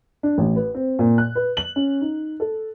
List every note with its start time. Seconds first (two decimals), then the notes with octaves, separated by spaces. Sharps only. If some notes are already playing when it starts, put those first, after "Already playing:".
0.23 D4
0.38 A1
0.56 B4
0.74 C4
0.99 A#2
1.18 F#6
1.35 B4
1.57 F#7
1.76 C#4
2.01 D#4
2.40 A4